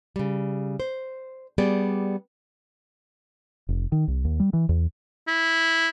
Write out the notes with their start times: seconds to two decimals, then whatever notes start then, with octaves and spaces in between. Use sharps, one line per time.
0.16 C#3 G3
0.80 C5
1.58 G3 B3 G4 G#4 D5
3.69 F1
3.92 D#3
4.08 C2
4.25 D#2
4.40 G3
4.53 E3
4.69 E2
5.28 E4